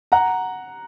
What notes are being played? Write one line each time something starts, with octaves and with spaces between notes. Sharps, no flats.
F#5 A#5